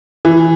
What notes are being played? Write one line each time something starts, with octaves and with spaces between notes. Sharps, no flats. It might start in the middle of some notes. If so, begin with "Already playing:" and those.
E3